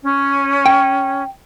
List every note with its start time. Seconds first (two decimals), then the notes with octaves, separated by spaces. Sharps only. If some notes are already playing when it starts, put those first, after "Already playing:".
0.03 C#4
0.66 G5